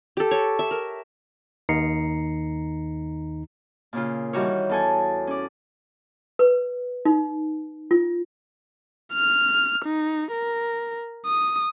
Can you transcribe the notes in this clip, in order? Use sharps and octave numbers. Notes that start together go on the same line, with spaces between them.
G4 A4
C#5
E5
A#4
D#2 D#3 D#4 A#5 C7 C#7
A#2 C#3 F4
D#3 E3 G3 F#4 G4 C#5
E2 A4 G#5
C#4 D5
B4
D#4
F4
F6
D#4
A#4
D#6